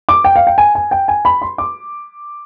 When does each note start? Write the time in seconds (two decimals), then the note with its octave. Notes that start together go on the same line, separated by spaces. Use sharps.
0.09 D6
0.24 G5
0.36 F5
0.47 G5
0.58 G#5
0.75 G#5
0.91 G5
1.08 G#5
1.25 B5
1.42 C6
1.58 D6